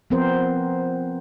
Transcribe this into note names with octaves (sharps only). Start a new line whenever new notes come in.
F3 B3 C4 A#4 C5